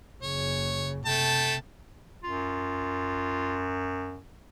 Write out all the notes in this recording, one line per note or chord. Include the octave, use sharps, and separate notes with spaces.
F#1 C#3 C#5
C3 A3 G5 A5
F#2 F4